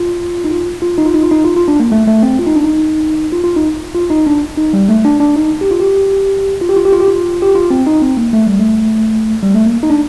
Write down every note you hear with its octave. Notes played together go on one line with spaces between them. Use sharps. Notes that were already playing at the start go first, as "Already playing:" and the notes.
Already playing: F4
D#4
F4
F4
D#4
F4
D#4
F4
D#4
F4
F4
D4
A#3
A3
A3
C4
F4
D#4
D4
D#4
F4
F4
D#4
F4
D#4
D4
D#4
G3
A3
D4
D4
D#4
G4
F4
G4
F4
G4
F4
G4
F4
G4
F4
G4
F4
C4
D#4
C4
A#3
A3
G3
A3
G3
A3
A#3
D#4
D4